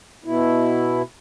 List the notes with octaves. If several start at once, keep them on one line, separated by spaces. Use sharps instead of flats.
B2 E4